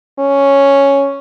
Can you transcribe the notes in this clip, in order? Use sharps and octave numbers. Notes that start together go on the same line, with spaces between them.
C#4